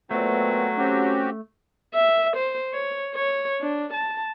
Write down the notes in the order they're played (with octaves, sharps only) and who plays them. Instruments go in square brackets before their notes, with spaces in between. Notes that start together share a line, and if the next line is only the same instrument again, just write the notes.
[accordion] A#2 C4 [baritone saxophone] F#3 [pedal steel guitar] A3 [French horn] B3
[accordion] C4 F#4 G4 [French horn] C#4
[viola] E5
C5
C#5
C#5
D4
A5